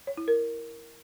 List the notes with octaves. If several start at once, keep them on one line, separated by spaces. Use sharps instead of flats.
C#5
E4
A#4